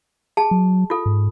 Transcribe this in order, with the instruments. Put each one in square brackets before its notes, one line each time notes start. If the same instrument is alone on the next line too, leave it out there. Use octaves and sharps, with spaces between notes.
[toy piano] G#4 A5
[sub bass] F#3
[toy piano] F4 A4
[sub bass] G#2